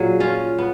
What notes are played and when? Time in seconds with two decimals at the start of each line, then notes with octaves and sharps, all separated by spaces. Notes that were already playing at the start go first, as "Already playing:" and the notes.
Already playing: A#2 F#3 G#4
0.20 C#4 F4
0.59 B3